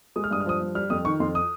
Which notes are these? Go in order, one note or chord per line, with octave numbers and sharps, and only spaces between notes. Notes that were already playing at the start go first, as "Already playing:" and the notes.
G#3 D#6
F6
G2 D#6
F6
F3 D#6
G2
G3 F6
F2 D#6
D#3 C#6
F2 C6
D#6